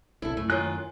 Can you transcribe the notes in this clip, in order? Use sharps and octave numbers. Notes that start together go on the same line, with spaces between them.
B1 C3 E4 A4
F#2 A3
D#3 F4 C#5 G#5 F#6